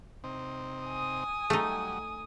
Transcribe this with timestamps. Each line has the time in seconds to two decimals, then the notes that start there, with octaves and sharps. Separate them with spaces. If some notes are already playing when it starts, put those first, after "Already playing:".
0.24 C3 C4 D#4
0.85 G#5 D#6
1.50 F#3 G3 A3 D#4